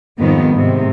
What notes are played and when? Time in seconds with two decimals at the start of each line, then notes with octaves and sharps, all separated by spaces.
0.18 F2 G#2 D#3 G3 B3
0.53 G#2 C3 D#3